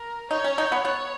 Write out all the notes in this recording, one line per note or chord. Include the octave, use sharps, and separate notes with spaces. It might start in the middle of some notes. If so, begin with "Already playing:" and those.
Already playing: A#4
D#4 C#5
C#4
D#4
B3
B3 C#5